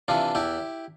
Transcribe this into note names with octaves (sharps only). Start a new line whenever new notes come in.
C3 E3 D4 F4
E2 E4 G4